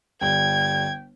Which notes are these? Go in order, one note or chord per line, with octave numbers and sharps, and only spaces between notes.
G1 G3 G5 G#6 G7